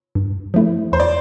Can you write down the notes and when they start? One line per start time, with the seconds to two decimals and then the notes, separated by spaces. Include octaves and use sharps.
0.15 G2
0.54 F3 A3 E4
0.92 E2 C5
1.00 D5